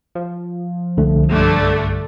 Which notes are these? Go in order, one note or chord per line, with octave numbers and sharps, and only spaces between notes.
F3
C2 D3 A3
B1 G2 D3 G3 A3 D4